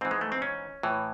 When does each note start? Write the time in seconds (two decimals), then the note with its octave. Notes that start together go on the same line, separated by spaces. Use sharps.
0.01 G#2 E3 C4
0.11 G#3
0.21 A3
0.32 C4
0.42 C#4
0.83 A2 E3